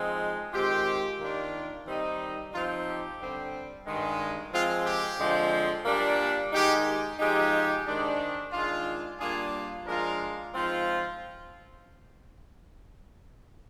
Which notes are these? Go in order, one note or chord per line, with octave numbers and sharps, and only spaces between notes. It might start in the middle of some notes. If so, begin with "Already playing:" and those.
Already playing: F3 G#3 C4 D#4
D#3 G#3 C4 F4 G4
D#3 A#3 D4 F4
D#3 G3 C4 D#4
F3 C4 D#4 F4
G4
D3 G3 C4
G2 D#3 G#3
F3 G#3 C4 F4
G4
D3 F3 G#3 C4
A#2 G3 A#3 D4
D#3 G#3 D#4 G4
F3 G#3 D#4 G4
G#2 D#3 G#3 D4
D#3 G#3 D4 F4
A#2 G3 A#3 D4 F4 G#4
F3 G#3 D4 F4 A#4
G#2 F3 C4 F4